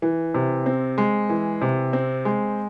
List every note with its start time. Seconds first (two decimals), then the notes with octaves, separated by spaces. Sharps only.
0.02 E3
0.34 C3
0.66 C4
0.98 G#3
1.30 E3
1.61 C3
1.93 C4
2.25 G#3